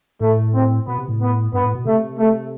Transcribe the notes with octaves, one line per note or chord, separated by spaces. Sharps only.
A2 A3
C4
B2 B3
C3
A2
B3
G2 B3
A2
B2
C3 A3
A3